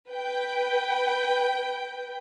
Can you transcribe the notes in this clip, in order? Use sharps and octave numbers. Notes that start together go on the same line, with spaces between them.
B4 G5